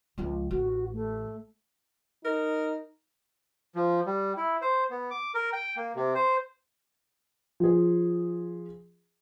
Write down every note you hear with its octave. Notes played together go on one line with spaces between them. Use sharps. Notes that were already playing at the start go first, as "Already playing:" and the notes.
C#2 F3
A1 F#4
A3
D#4 A#4
F3
G3
E4
C5
B3
D6
A#4
G5
A#3
C3
C5
F3 G#4